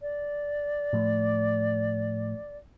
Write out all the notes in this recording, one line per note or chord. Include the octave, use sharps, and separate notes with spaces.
D5
A2 F3 A3